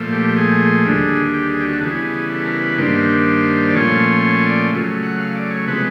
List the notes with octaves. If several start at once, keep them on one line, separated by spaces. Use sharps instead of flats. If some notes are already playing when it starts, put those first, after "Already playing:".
Already playing: A#2 F3 A3
G4
G#4
D#2 D3 G3
G4
G#4
G4
F#4
A4
C#3 E3 G3 B3 G#4
A4
A#4
B4
G2 D#3 G3 A#3 D4 C5
D5
A#2 F3 A3 C#4 F4 C#5
C#5
D5
C#3 F#3 A3
F#5
F5
D5
C#5
C3 F3 G#3 B3 B4